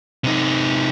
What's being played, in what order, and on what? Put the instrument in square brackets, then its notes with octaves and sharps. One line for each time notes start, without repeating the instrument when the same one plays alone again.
[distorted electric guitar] C3 D#4